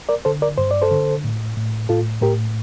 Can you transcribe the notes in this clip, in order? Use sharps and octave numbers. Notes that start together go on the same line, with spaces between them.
A#4 D5
D3 A4 C5
A#4 D5
G2 C5
D5
A4 C5
D3
A2
A2
A2 F4 A4
A2 G4 A#4